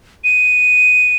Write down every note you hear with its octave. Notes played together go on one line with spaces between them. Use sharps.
D#7